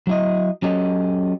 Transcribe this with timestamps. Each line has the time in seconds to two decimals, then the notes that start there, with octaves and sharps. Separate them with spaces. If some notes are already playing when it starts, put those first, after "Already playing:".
0.07 F#3 E4 D#5
0.62 F#3 C#4 G4 A4 D#5